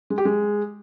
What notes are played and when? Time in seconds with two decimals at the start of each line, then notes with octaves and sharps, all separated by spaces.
0.10 G#3
0.18 G4
0.25 G#3